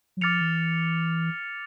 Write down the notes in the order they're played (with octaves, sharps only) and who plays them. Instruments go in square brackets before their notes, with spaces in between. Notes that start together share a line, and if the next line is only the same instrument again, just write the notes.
[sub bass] F#3
[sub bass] F3 [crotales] D6 F6 A6 C#7 F7
[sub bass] E3